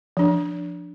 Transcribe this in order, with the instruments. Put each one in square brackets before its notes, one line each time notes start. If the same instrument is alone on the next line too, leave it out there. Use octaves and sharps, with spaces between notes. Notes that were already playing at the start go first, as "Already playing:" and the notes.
[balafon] F3 D4